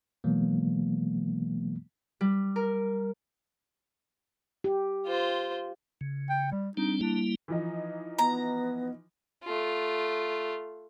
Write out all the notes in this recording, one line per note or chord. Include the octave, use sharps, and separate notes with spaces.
B2 E3 F#3 G#3 A#3 B3
G3
A#4
G4
F4 C5
C#3
G5
G3
G3 C4 D4 D#4
G3 A#3 D4 E4
E3 F3 D#4
B3 A#5
A3 F4